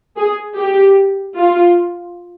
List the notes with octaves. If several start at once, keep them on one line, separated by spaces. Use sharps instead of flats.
G#4
G4
F4